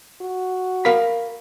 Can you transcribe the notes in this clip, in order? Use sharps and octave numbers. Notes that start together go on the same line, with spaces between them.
F#4
A#4 F5 B5